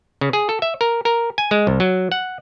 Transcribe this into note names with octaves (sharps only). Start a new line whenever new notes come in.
C#3
G#4
A4
E5
A#4
A#4
G#5
G#3
C2
F#3
F#5